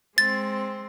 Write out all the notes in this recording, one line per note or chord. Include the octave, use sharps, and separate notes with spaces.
G#3 C4 A6